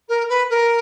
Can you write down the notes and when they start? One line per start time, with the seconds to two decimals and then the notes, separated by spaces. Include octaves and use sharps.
0.08 A#4
0.28 B4
0.49 A#4